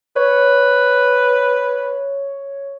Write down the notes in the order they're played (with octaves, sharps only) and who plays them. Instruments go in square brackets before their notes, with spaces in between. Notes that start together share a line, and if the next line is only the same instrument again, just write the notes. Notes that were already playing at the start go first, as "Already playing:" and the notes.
[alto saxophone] B4 [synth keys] C#5